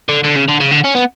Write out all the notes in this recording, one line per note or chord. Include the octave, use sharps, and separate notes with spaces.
D3
D3
C#3
D3
C#3
D3
C#4
B3